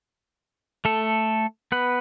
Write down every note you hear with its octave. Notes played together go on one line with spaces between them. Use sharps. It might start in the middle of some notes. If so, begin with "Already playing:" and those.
A3 A4
B3 B4